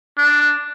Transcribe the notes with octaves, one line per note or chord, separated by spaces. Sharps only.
D4